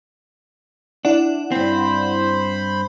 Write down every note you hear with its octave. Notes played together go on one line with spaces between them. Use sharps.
D4 E4 D5 F#5
G2 C4 C5 B5